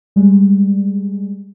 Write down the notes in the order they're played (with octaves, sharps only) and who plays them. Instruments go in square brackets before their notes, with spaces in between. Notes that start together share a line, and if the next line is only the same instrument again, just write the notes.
[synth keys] G3 G#3